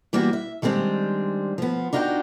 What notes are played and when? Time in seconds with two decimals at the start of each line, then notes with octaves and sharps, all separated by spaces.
0.13 E3 G3 A#3 B3 F#4
0.33 E5
0.62 D#3 G3 G#3 C4 D4
1.58 F3 B3
1.93 D4 D#4 F4 F#4 E5 G5